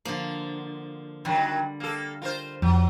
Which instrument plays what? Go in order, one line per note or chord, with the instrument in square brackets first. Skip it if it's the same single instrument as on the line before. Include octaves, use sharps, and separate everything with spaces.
[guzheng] D3 A#3 [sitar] F3
[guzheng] D3 G3 [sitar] D#3 F#3
[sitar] A#3 A4
F4 A#4 C5
[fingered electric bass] F2 [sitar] F#3